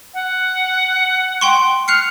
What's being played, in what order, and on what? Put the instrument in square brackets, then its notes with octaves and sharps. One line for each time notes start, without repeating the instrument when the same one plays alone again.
[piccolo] F#5
[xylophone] G5 C6 C#6
[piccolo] F6 [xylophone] F#6 C7 C#7